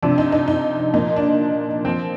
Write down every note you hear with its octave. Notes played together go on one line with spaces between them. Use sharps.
C3 F3 D4
D#4
D#4
D#4
A#2 F3 D#4
D4
A#2 F3 C4